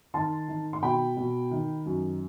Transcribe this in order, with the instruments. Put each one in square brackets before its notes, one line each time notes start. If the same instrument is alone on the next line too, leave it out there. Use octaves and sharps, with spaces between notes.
[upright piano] D#3 A5 C6
D#3
C6
B2 G5 B5
B2
D#3
F#2